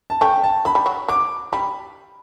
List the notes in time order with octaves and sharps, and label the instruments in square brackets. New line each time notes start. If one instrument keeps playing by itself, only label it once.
[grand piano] A5
[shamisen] A3 C#4 [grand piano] G5
[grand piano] A5
[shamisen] F#3 [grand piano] B5
[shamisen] G3
F#3
[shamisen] F#3 [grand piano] D6
[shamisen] G3 [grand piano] B5